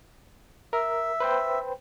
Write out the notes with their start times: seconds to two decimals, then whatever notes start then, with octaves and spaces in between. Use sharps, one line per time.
0.73 A#4 E5
1.20 B4 C5 G5